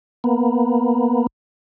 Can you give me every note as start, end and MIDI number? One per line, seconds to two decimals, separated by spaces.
0.24 1.27 58
0.24 1.27 59